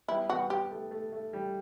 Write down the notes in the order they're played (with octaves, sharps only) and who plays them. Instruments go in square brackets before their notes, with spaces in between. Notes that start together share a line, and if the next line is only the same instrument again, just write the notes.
[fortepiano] G3 B3 [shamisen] E4
[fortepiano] G3 B3 [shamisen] F#4
[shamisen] G4
[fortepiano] A3
A3
A3
G3